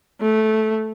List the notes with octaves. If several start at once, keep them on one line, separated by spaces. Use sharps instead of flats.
A3